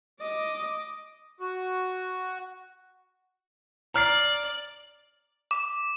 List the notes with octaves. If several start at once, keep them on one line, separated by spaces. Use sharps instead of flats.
D#5 D6
F#4
D5 A#5 F6 C7
D6